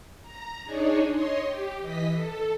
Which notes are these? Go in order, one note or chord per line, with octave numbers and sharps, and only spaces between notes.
A#5
D4 D#4 G#4 C#5
C#5 D#5 C6
G4
E3 D#5 B6
A4